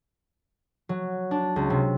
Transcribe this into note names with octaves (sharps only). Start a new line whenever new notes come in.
F#3
D4
C#2
C3